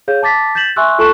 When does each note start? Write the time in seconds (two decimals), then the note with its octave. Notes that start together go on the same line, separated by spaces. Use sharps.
0.08 G#4 C#5 F5 G6
0.23 A5 D6 A6 B6
0.55 G6 A6 B6 E7 F#7
0.76 E5 G#5 C6 C#6 E6 F#6
0.98 F4 A4 A5 C#6 F#6 E7